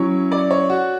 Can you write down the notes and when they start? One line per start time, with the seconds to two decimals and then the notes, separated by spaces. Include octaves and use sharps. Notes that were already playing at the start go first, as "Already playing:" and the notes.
Already playing: F#3 C#4 E4 C#5
0.32 D5
0.51 C#5
0.70 F#4